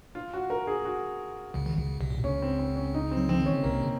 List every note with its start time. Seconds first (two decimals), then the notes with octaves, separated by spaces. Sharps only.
0.15 F4
0.33 F#4
0.50 A#4
0.67 G#4
0.85 F#4
1.54 C#2 C#3
1.66 D#3
1.78 C#2 C#3
2.01 C2 C3
2.10 A#2
2.18 C3
2.24 C#2 C#3 C#4
2.42 C4
2.59 C4
2.76 C#4
2.94 D#4
3.11 C4
3.17 F#3
3.29 F3 C4
3.40 D#3
3.46 C#4
3.53 C#3
3.63 C2 C3 A#3
3.82 C#3